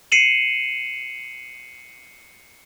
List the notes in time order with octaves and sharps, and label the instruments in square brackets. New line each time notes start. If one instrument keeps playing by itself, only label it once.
[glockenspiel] C7 C#7 D#7 E7 F#7